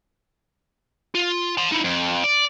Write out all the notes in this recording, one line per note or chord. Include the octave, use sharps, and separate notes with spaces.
F4
A5 C6
D#4 E4
F2
D5